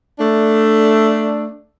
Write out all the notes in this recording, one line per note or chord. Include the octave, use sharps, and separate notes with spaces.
A3 D4